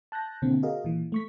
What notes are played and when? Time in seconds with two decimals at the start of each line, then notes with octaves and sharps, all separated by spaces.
0.12 A5 F#6 G6 A#6
0.42 B2 D3 A#3 C4
0.63 F#4 G#4 A#4 D#5 F5
0.84 A#2 E3
1.12 A3 C#6 B6